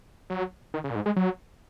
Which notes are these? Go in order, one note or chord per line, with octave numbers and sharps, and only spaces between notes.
F#3
D#3
C#3
A#2
G#2
G#3
F#3